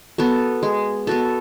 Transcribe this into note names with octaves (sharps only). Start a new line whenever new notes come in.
B3 F#4 A4
G#3
B3 F#4 A4